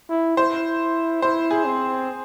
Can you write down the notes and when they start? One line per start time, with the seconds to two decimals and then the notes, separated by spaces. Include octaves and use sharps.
0.09 E4
0.37 E4 C5
1.22 E4 C5
1.51 G#4
1.65 C4